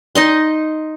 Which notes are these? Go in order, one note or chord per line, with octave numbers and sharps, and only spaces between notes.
D#4 D#5 C6